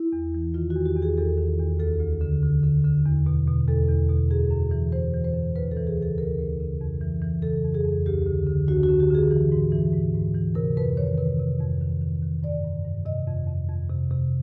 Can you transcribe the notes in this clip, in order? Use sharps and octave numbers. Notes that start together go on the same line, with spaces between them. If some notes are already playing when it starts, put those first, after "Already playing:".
Already playing: E4
E2
E3
D#3 F4
F#4
E2
G4
E2
G#4
E2 A4
D#3
E2
D2 A4
D2
D3
D3
D3
D3
E2
B2
B2
E2 A4
E2
B2
F#2 G#4
F#2
E3
E3 C5
E3
C5
F#2
D2 B4
A4
E3
G#4
C#3
A4
D2 A#4
D2
C#3
F2
E3
E3
C#3 A4
F2
G#4
F2
D2 G4
D3
D3
D2 F#4
F#4
D3
G4
D3 G#4
E3
G#2
E3
G#2
G#2
E3
C3 A#4
F2 B4
D#3 C#5
C3 B4
C3
F2
D#3
D#3
D#3
G2 D5
G2
G2
C3 D#5
F2
F2
F2
C3
C3